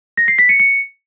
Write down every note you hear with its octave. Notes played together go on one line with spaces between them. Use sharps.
A#6
C7
B6
C#7
C#7